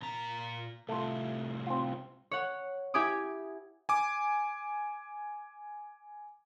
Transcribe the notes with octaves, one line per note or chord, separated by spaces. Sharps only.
A#2 A#5
C2 A2 A3 F4
C4 F4
C#5 F#5
E4 G4 G#5 D6 D#6
G#5 D6